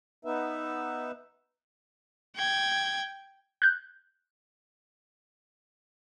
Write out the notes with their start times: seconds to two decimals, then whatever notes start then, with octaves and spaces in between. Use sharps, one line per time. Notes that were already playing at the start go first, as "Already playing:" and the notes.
0.25 B3 D#4 B4 E5
2.36 G5 G#6
3.62 F#6 G6